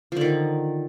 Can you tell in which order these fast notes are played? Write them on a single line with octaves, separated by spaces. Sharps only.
F3 D3 D#3